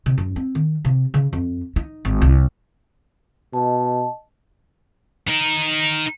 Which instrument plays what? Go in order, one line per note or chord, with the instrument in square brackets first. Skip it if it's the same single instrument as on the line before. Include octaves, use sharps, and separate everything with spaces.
[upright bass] C3
F#2
C4
D#3
C3
C#3
F2
D#4
G#1
C2
[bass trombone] B2 [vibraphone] D#5 A5
[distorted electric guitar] D#4 A#4